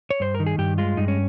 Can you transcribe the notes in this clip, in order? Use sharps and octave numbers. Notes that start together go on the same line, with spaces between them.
C#5
G2 C5
A#4
D#3
G#4
G2 G4
G#3 F4
G2 D#4
C#4